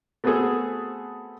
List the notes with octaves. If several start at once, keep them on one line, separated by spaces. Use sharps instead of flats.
A3 B3 C4 F#4 G#4 A4